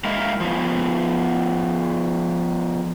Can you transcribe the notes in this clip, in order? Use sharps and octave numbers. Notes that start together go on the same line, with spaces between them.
G#3 A#3 E4 F5
F3 B3